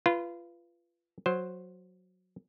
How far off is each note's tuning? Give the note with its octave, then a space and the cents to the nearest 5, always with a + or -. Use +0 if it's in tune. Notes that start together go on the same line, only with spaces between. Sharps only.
F4 -25 B4 +0
F#3 -10 C5 +0